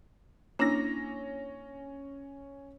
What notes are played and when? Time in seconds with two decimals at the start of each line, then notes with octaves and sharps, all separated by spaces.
0.59 A#3 C#4 D4 E4 A#6